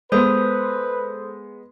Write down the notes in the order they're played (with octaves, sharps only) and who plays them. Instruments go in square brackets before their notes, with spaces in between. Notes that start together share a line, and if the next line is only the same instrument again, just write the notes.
[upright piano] G#3 B3 [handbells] A4 C5 D#6 [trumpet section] B4